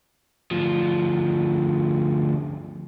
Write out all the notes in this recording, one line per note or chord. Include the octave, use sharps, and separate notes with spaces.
D2 F3